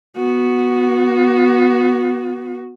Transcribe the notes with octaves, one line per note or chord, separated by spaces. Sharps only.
B3 F#4